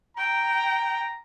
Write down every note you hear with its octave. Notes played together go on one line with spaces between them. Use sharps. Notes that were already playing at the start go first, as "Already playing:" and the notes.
G5 A#5